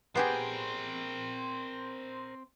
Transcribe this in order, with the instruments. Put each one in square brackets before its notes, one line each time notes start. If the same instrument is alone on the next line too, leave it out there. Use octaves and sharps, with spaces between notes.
[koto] B3 G4 G#4 [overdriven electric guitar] C4 [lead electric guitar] A#4 C5